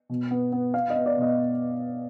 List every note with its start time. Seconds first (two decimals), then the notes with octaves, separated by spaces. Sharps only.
0.09 B2
0.31 B3
0.52 B3
0.74 B3 F5
0.90 D#5
0.95 B3
1.06 D5
1.17 B2
1.22 D#5